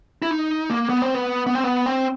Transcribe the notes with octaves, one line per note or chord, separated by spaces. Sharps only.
E4
D#4
A#3
B3
C4
B3
B3
C4
B3
C4